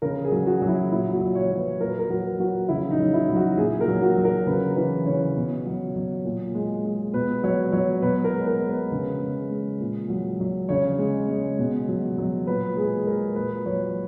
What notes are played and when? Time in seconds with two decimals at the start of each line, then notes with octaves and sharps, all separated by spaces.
0.02 C#3 A#4
0.25 G#4
0.32 F#3
0.47 F#4
0.62 F#3
0.69 E4
0.91 A#2 E4
1.13 F#4
1.21 F#3
1.35 C#5
1.50 F#3
1.58 B4
1.81 A#2 A#4
1.90 B4
1.99 A#4
2.10 F#3 F#4
2.39 F#3 F#4
2.69 C#3 E4
2.91 D#4
2.99 F#3
3.14 E4
3.29 F#3
3.36 F#4
3.57 A#2 G#4
3.81 A#4
3.88 F#3
4.02 F#4
4.18 F#3
4.25 A#4
4.47 C#3 B4
4.76 E3 B4
5.06 C#3 C#5
5.36 B2
5.66 F#3
5.96 F#3
6.24 A#2
6.55 G#3
6.84 G#3
7.13 B2 B4
7.43 F#3 C#5
7.72 F#3 C#5
8.02 B2 B4
8.24 A#4
8.33 G#3
8.47 A#4
8.62 G#3
8.69 B4
8.92 C#3
9.21 G#3
9.51 G#3
9.80 A#2
10.09 F#3
10.40 F#3
10.69 C#3 C#5
10.99 G#3
11.29 G#3
11.58 B2
11.88 F#3
12.18 F#3
12.47 A#2 B4
12.77 G#3 G#4
13.06 G#3 A#4
13.36 A#2 B4
13.66 F#3 C#5